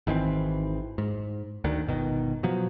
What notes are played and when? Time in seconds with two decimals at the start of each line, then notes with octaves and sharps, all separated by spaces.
0.07 G#1 D#3 E3 C4
0.98 G#2
1.64 D2 D3 D#3
1.87 G1 B2 D#3
2.43 B2 F3 F#3